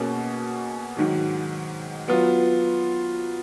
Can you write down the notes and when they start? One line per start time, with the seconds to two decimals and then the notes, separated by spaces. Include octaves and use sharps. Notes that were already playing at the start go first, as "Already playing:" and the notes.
Already playing: B2 A#3 C#4 G#4
0.97 G#2 D#3 F#3
2.08 F#3 B3 F4